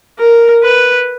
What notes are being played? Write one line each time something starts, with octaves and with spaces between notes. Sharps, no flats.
A#4
B4